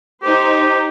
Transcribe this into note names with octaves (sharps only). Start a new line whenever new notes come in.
D#4 G4 C5